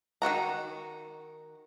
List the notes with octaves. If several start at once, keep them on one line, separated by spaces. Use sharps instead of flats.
D#3 E3 F#4 A#5